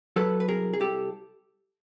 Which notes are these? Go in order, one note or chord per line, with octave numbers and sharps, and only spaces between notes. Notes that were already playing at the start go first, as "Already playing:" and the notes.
F#3 A4 B4
B4
C2 G#4 A#4
G#4
C2 G4 A4